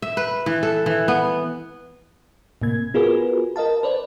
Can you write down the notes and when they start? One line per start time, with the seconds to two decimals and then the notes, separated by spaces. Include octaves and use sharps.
0.02 E5
0.17 B4
0.46 E3
0.63 A4
0.86 E3
1.08 B3
2.62 A2 C3 A#3 G#6
2.94 B3 F4 F#4 G#4 A#4 B4
3.56 A#4 D#5 F5 A5
3.83 B4 C5 D5